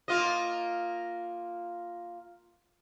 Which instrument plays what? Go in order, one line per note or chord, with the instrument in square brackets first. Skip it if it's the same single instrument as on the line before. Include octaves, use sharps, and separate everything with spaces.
[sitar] A#3 F4 D#5